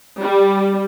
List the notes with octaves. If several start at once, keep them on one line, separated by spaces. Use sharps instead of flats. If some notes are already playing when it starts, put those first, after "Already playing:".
G3